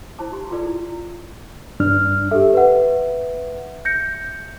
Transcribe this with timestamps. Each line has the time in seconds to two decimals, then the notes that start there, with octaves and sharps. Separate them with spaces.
0.19 E4 C5 A5 D6
0.31 D#4 G4 C6
0.51 F4 G#4 A4 B4 D5 D6
0.66 E4
1.80 G2 D4 F6
2.31 G4 A4 E5
2.54 B4 F#5
3.85 G6 A#6 C#7